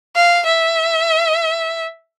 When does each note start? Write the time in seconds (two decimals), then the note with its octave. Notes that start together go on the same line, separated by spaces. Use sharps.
0.16 F5
0.46 E5